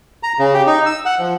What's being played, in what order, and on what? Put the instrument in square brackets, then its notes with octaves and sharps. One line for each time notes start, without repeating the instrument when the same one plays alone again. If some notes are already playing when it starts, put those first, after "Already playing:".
[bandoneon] A#5
C#3
G4
D#4
E6
F#5
F3